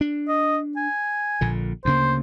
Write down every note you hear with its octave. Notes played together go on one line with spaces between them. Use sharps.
D4
D#5
G#5
A#1 A#2 D3
D2 C#3 A#3 C5